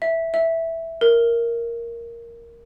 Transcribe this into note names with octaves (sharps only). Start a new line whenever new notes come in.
E5
E5
A#4